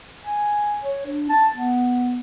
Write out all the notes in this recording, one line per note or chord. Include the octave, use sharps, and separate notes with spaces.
G#5
C#5
D4
A5
B3